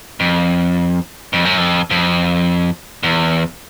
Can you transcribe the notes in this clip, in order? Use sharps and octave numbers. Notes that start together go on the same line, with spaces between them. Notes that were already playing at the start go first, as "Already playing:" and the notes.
F2
F2
F#2
F2
F2
E2